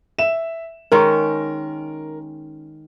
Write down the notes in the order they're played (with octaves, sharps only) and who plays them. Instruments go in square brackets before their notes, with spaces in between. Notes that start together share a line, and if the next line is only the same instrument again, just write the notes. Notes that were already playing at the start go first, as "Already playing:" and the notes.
[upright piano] E5 E7
[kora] D#3 G#3 C#4 [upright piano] A#4